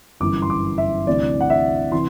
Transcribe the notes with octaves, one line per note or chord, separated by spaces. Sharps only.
G1 F#2 E3 D6
C6
D6
E5
D2 C3 E3 D5
F#5
E5
C3 E3 C6